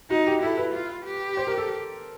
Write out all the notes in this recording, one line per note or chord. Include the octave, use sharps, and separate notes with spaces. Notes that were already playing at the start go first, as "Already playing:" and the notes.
D#4 F#4
G4
E4 A4
B4
F4
G4
C5
A#4
A4